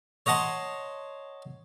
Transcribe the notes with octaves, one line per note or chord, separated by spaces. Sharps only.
C#5 D#5 F#5 A5 C6